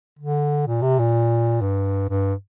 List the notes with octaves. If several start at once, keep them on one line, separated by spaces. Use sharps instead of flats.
D3
A#2
C3
A#2
G2
G2